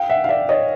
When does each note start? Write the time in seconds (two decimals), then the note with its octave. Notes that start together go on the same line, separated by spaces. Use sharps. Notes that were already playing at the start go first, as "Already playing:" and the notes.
Already playing: F5 G5
0.09 E5 F#5
0.24 F5
0.29 D5 E5
0.49 C#5 D#5